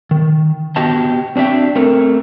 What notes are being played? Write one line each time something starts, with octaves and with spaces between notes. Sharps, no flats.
D#3
B3 F#4 G4 D#5 A5
C4 D4 F#4 E5 G5
A3 C4 A#4